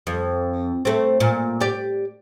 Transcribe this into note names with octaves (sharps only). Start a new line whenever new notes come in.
F2
A3 C4
A#2
G4 D5